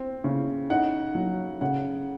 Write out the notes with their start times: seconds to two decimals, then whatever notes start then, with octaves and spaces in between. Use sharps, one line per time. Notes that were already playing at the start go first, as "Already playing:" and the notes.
Already playing: C4
0.24 C#3
0.70 D#4 F#5
1.15 F#3
1.61 C#3 F#5